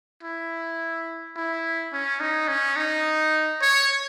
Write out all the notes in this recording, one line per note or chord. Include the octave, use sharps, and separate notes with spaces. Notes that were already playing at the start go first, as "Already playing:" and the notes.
E4
E4
C#4
D#4
C#4
D#4
C#5